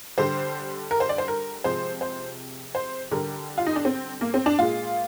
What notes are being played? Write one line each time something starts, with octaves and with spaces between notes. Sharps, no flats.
D3 G3 C5
A#4
C5
D5
C5
A#4
C3 F3 G#3 C5
C5
C5
D3 G3 A#4
F4
D#4
D4
C4
A#3
C4
D4
A#2 G#3 F4